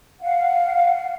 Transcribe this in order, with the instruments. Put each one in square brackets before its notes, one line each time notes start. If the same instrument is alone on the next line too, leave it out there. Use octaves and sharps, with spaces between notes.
[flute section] F5 F#5